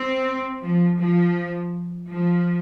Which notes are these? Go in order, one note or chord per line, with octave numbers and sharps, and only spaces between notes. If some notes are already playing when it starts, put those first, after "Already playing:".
Already playing: C4
F3
F3
F3